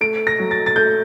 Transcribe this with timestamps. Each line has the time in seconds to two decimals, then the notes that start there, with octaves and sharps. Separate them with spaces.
0.01 A3 D7
0.27 A#6
0.39 F#3
0.51 A6
0.66 A6
0.76 A3 G6